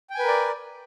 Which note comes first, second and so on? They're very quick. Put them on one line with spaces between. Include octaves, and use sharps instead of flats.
G5 G#5 B4 A#4 D5